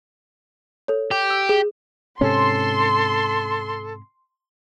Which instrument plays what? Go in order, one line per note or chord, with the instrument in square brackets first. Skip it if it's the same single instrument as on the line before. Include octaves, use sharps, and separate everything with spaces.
[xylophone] A4 C#5
[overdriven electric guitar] G4
[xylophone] E6
G#4
[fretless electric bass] G#2 C3 C#4 [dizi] A4 [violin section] C6